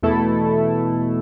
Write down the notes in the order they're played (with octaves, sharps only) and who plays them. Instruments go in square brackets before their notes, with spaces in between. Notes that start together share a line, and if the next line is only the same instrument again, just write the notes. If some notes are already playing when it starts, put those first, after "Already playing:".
[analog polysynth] E2 B2 A3 E4 A4